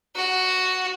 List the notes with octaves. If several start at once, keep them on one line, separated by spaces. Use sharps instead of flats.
F#4